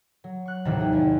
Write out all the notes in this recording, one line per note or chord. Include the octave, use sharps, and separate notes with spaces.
F#3
C#6 F#6
A1 D#2 C3 D#3 E3
G#4 G5
E2